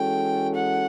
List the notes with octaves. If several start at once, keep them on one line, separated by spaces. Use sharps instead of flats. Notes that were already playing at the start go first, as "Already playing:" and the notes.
Already playing: E3 G#3 C#4 F#4 A4 G5
F#5